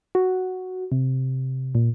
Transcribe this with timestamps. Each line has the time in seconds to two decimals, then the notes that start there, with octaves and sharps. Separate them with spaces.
0.15 F#4
0.92 C3
1.75 A#2